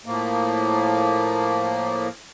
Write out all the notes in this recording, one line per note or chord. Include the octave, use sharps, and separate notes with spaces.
A2 F3 A#3